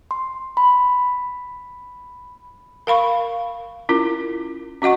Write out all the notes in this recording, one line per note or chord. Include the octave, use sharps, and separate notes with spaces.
C6
B5
A#4 F5 B5 C#6
C#4 E4 F4 A#4
C#4 F#4 D#5 F#5 C#6